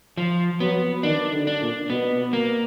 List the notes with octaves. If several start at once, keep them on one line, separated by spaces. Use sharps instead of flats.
F3
F#3 B3
D#3 D4
D3
D4
A#2
B2 B3
A#3